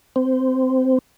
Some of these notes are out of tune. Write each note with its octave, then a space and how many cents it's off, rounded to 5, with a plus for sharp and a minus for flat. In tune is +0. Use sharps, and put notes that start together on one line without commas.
C4 -15